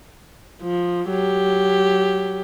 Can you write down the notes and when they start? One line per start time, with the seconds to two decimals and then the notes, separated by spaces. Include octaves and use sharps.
0.62 F3
1.09 F#3 G4